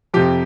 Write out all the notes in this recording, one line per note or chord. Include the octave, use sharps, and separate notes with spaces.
F2 C3 F3 G4